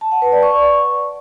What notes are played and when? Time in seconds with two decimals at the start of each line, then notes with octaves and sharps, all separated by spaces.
0.01 A5
0.12 F#5
0.22 B4
0.32 D5
0.43 C#6